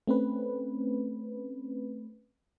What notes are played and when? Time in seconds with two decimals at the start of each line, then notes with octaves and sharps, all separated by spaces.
0.07 A3 C4 C#4 B4